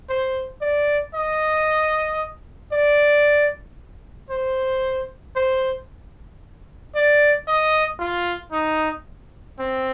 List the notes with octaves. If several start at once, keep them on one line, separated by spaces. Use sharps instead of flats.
C5
D5
D#5
D5
C5
C5
D5
D#5
F4
D#4
C4